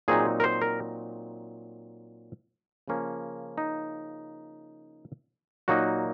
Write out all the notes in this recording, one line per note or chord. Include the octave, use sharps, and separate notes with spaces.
A#2 F#3 C4 D#4 G#4
A#4
C5
A#4
C#3 F3 A#3 C#4
D#4
A#2 F#3 A#3 D#4 F#4